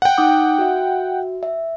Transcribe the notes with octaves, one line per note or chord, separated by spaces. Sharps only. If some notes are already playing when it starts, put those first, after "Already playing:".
F#5 G5
D#4 D6 D#6
F#4 E5
E5